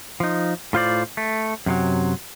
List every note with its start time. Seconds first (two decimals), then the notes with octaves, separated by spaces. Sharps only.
0.20 F3 D#4
0.73 A2 F4 C5 D5
1.17 A3
1.66 F#2 C3 F#3